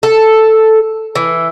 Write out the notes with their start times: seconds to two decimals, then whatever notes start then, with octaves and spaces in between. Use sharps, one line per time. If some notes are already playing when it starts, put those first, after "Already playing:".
0.03 A4
1.15 E3